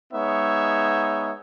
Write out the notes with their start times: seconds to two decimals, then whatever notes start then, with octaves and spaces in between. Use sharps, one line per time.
0.13 G#3 B3 D#4 C#5 E5